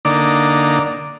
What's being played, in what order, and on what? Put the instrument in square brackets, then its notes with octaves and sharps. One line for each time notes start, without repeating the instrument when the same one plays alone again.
[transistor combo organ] D3 A#3 D#4 D5